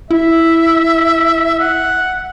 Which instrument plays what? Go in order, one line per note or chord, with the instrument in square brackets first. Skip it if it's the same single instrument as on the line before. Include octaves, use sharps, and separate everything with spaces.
[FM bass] E4 [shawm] E5
[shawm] F#5